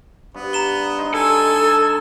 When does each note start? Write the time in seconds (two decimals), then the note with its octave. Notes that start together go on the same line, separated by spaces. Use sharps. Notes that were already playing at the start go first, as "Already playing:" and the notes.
0.34 G2 B3
0.53 A#5 E7 G7
0.98 D#4 D#5 C6
1.14 A4 G#5 E6